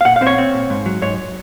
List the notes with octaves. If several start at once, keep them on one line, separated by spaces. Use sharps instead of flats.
F5
A#2 F#5
F5
C4 C5
C#5
C4
A#2
G#2
F#3
G#2 C#5